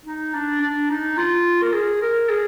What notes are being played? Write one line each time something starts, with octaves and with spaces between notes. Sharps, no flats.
D#4
D4
D4
D#4
F4
A#4
G#4
A#4
G#4